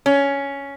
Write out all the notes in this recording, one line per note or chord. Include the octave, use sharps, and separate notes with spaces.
C#4